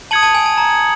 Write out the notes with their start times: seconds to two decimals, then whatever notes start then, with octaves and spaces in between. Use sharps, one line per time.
0.11 A5 D#6 G#6 C#7 F#7
0.23 A5
0.34 G#5
0.46 A5
0.58 A#5